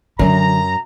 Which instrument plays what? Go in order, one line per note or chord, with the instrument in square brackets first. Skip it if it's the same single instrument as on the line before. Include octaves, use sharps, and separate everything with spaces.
[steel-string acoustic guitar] F#2 [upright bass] D3 F#3 [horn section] A#5